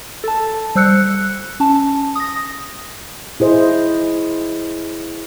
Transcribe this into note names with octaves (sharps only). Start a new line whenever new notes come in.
A4 A5
G3 C5 E6 F#6 C#7
C#4 A5
D#6 A#6
E4 G#4 C5 D#5